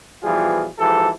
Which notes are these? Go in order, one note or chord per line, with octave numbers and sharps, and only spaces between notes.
B2 E3 F3 G3 F4 G#4
G#2 E3 F3 G4 A4